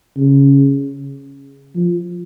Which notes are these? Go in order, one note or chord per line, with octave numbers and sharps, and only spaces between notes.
C#3
F3